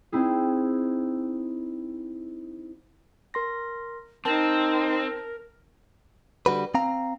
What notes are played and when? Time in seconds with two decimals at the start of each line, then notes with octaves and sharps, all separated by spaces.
0.12 C4 D#4 E4 G#4
3.34 A#4 C6 A#6
4.25 C4 D#4 A#4 A5
6.46 D3 G3 F#4 B4
6.74 C4 F5 A#5